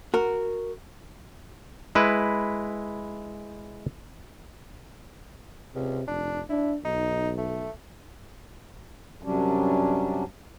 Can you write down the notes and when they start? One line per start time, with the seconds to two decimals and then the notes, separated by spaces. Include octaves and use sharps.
0.14 F#4 A#4
1.95 G#3 E4 B4
5.75 C#2 C3
6.08 F1 D4
6.49 D4 E4
6.85 B1 D#4
7.38 A3
9.23 F#2 C3 F#3 G3 C#4 D4